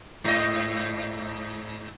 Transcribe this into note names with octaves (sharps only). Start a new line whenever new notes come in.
G#2 D#5